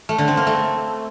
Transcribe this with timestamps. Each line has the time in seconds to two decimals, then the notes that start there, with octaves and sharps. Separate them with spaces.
0.09 A3
0.18 D3
0.28 C4
0.37 A#3
0.47 A3